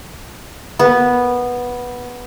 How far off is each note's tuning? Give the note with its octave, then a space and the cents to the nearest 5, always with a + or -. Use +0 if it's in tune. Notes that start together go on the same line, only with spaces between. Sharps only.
B3 -10